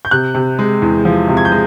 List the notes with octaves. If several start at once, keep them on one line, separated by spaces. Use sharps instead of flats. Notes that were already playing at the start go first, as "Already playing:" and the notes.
G6
C3 F#6
C3
G#3
E2
F3
C3
G#6
G6
G#3